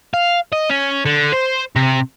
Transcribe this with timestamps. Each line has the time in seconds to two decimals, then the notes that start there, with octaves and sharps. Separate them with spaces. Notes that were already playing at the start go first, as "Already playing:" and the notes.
0.14 F5
0.53 D#5
0.70 C#4
1.05 D3
1.32 C5
1.76 C3